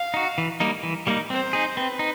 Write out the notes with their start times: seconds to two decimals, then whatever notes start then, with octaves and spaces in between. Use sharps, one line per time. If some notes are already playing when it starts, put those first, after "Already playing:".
Already playing: F5
0.14 D#4 F#4
0.38 E3
0.60 G3 A#3 D#4
0.83 E3
1.07 G3 A#3 D#4
1.30 C4 C5
1.53 D#4 G#4
1.76 C4 B4
1.99 D#4